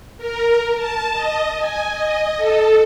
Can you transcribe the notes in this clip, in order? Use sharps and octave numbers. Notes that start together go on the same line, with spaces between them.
A#4
A5
D#5
G#5
D#5
A4